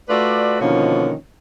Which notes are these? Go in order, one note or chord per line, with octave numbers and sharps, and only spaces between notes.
A3 F4 F#4 B4 D5
B2 D3 D#3 F3 A#3 C#4